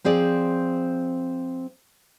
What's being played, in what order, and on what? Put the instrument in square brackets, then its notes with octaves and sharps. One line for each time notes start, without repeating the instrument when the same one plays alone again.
[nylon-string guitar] F3 C4 G#4 D5